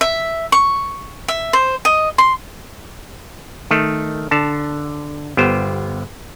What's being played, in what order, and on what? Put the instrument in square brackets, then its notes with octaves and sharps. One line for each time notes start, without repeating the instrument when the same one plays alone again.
[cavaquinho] E5
C#6
E5
C5
D#5
C6
[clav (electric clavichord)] D#3 A3
D3 A5
G1 B3 G4 C5